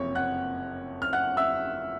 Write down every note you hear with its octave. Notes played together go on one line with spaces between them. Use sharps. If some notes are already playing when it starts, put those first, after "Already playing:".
Already playing: F#1 F2 C3 F3 C#5 C#6
F#5 F#6
F6
F#5 F#6
E5 E6